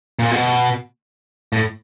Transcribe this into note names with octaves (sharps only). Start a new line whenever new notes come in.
A#2
B2
A2